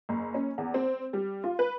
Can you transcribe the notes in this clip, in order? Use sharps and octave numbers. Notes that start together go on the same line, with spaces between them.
F#1
C#4
E2
C4
G3
F4
B4